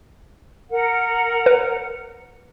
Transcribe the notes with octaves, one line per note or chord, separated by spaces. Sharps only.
A#4 F#5
B4